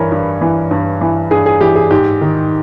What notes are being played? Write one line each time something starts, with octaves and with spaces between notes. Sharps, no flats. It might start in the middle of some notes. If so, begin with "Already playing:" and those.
Already playing: G2 E3 A#4 B4 C#5
G2
E3
G2
E3
G2 G#4
G#4
E3 G4
G#4
G#2 G4
D#3